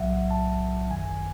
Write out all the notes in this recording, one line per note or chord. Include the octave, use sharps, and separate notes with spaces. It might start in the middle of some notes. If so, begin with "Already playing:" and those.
Already playing: B1 A2 F#3 E5 F#5
A5
G#1 F#2 D#3 G#5